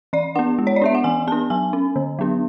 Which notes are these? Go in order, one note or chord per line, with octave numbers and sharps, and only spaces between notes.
E3 D5
B3 D4 F#5
G#3
C#5
D5
B3 D4 E5
F#5
E3 G#5
B3 D4 A5
F#3 G#5
C#4
D3
F#3 B3 D4